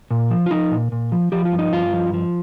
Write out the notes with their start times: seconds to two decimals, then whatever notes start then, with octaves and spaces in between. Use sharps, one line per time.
0.11 A#2
0.30 F3
0.46 F4
0.51 F3 D#4
0.71 A#2
0.92 A#2
1.12 F3
1.32 F3 G4
1.45 F4
1.52 G2
1.59 D#4
1.73 G2 F4
1.93 F3
2.13 F3